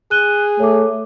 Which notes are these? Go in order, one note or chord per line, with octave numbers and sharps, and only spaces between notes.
G#4 F#6 D#7 G7
A3 C#5 D6